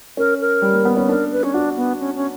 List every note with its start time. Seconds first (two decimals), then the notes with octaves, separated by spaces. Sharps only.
0.17 C#4 A#4
0.40 A#4
0.62 G3
0.73 A#3
0.85 B3
0.97 C#4
1.09 D4 A#4
1.32 B4
1.43 C#4
1.54 D4 F#4
1.77 B3
2.00 C#4
2.16 C#4